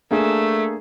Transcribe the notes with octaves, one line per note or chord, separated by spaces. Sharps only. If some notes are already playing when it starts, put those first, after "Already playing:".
A3 A#3 D4 G#4